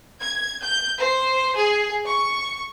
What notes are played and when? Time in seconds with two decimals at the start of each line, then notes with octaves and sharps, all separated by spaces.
0.20 G#6
0.61 G6
0.99 C5
1.56 G#4
2.08 C#6